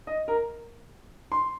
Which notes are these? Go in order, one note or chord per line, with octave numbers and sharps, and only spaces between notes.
D#5
A#4
C6